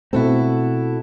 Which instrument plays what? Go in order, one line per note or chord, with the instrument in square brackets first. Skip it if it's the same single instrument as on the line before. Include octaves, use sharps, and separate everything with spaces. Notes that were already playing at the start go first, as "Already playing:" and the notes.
[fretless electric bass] B2 A3 C4 [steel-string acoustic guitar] E4 F#4 A4